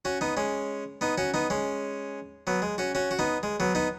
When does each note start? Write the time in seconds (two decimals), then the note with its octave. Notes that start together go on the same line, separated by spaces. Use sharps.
0.05 C#4 F#4
0.21 B3 D#4
0.37 G#3 C#4
1.01 B3 D#4
1.18 C#4 F#4
1.34 B3 D#4
1.50 G#3 C#4
2.47 F#3 B3
2.62 G#3
2.78 C#4 F#4
2.95 C#4 F#4
3.11 F#4
3.19 B3 D#4
3.43 G#3
3.60 F#3 B3
3.75 B3 D#4